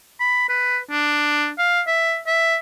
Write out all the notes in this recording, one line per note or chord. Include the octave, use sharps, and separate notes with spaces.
B5
B4
D4
F5
E5
E5